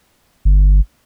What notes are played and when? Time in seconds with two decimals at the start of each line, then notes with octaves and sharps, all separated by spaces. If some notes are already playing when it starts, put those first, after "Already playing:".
0.45 G1